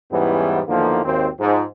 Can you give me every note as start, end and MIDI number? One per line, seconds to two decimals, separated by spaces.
0.11 0.60 40
0.11 0.60 44
0.11 0.60 52
0.11 0.60 55
0.11 0.60 59
0.11 0.60 61
0.68 1.04 40
0.68 1.04 50
0.68 1.04 51
0.68 1.04 53
0.68 1.04 58
1.04 1.27 32
1.04 1.27 39
1.04 1.27 60
1.39 1.63 44
1.39 1.63 53